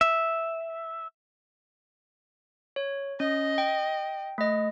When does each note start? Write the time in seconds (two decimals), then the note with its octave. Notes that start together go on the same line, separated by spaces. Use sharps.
0.01 E5
2.76 C#5
3.20 C#4 D#5
3.58 G5
4.38 A3 D#5